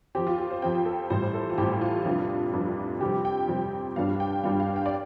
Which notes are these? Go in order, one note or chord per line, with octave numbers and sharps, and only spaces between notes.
F2 F3 C4 G4
F4
G4
C5
F2 F3 C4 G5
A4
A1 A2 G3 C4 C5
A4
F4
A1 A2 G3 C4 G4
G4
F4
F1 F2 C3 G3 D4
F1 F2 C3 G3 D4
F2 C3 G3 C4 G4
G5
F2 C3 G3 C4
G2 G3 D4 F5
F5
G5
G2 G3 D4 F5
F5
G5
D5